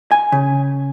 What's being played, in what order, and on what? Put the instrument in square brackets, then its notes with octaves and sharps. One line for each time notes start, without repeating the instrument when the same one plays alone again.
[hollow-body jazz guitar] G#5
C#3